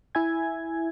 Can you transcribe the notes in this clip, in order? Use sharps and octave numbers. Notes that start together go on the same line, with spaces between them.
E4 E5 G#5 G#6